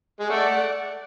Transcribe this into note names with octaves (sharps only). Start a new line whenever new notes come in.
G#3
A3 D5 F#5